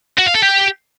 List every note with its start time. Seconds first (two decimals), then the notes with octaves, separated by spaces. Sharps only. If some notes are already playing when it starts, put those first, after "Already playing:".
0.18 F#4
0.26 F5
0.34 A4
0.42 G4